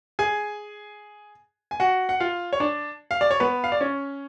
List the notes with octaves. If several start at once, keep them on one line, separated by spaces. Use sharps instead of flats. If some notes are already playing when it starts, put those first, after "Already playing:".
G#4 G#5
G#5
F#4 F#5
F#5
F4 F5
C#5
D4 D5
F5
D5
C#5
B3 B4
F5
D5
C#4 C#5